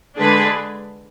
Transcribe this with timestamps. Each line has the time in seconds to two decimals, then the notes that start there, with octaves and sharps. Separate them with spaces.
0.18 D3 G#3 D4 G#4 B4